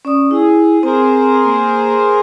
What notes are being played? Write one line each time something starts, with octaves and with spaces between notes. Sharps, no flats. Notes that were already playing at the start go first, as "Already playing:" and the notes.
C#4 D5 D#6
E4 G#4
C4 G#4 A#4 C5
A#3